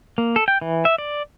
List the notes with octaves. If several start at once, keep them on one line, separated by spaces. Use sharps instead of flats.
A#3
A4
G5
E3
E5
D5